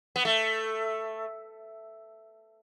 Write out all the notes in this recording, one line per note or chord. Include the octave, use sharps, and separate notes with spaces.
B3
A3